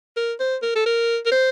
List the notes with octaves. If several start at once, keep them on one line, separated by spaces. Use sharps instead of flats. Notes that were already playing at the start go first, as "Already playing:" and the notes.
A#4
C5
A#4
A4
A#4
A#4
C5